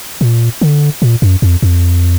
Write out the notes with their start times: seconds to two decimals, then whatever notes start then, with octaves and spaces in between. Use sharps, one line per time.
0.21 A#2
0.61 D3
1.02 A#2
1.22 F#2
1.42 F2
1.62 F2